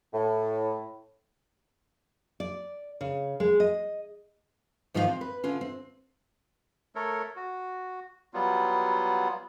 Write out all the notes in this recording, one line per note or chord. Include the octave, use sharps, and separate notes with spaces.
A2
D5
C#3
G#3
D#5
G#2 D#3 F3 F4 C5 F5
C4
B4
D3 C#4 F4
C4
A3 A4 A#4 C#5
F#4
F#3 G3 B3 F4